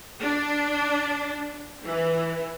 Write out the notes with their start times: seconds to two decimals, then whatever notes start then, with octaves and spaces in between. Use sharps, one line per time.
0.22 D4
1.85 E3